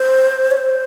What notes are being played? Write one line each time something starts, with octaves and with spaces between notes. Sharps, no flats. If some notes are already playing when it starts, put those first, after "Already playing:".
Already playing: C5
C#5
C5